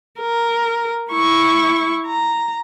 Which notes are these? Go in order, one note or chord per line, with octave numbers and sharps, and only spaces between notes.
A#4
E4 C#6
A#5